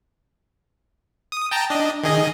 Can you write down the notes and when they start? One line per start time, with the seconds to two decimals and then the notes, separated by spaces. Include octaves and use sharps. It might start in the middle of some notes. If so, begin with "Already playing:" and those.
1.32 D#6
1.51 G5 A5 A#5
1.70 D4 D#5
2.03 D#3 G#4 D#5